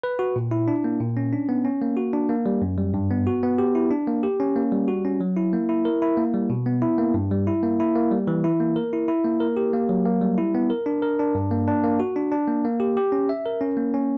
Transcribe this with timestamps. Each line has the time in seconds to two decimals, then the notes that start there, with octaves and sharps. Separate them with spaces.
0.03 B4
0.19 F#4
0.36 A#2
0.51 E4
0.68 D4
0.84 A#3
1.00 A#2
1.17 C#4
1.32 D4
1.49 B3
1.65 C#4
1.81 A#3
1.97 F#4
2.13 D4
2.29 A#3
2.46 G3
2.62 F#2
2.78 G3
2.94 G2
3.11 B3
3.27 F#4
3.43 B3
3.58 G4
3.75 E4
3.91 D4
4.07 A#3
4.23 G4
4.40 C#4
4.56 A#3
4.72 G3
4.88 F#4
5.05 C#4
5.21 F#3
5.37 E4
5.53 A#3
5.69 E4
5.85 A#4
6.02 E4
6.17 A#3
6.34 G3
6.50 B2
6.66 B3
6.82 E4
6.98 A#3
7.14 G2
7.31 G3
7.47 E4
7.63 A#3
7.80 E4
7.95 A#3
8.11 G3
8.27 E3
8.44 E4
8.60 A#3
8.76 A#4
8.93 E4
9.08 E4
9.24 A#3
9.40 A#4
9.57 G4
9.73 A#3
9.89 F#3
10.05 A#3
10.22 G3
10.38 E4
10.55 B3
10.70 A#4
10.86 D4
11.02 A#4
11.19 D4
11.35 G2
11.51 A#3
11.68 D4
11.84 A#3
12.00 F#4
12.16 D4
12.32 D4
12.48 A#3
12.65 A#3
12.80 G4
12.97 G4
13.12 C#4
13.29 E5
13.46 A#4
13.61 C#4
13.77 A#3
13.94 C#4